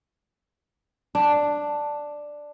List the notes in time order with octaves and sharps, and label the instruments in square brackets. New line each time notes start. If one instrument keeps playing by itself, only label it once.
[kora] D4